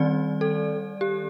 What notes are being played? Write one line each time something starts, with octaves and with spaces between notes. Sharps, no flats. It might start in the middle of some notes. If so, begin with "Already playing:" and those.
Already playing: D#3 G3 C4 D5
A4
G4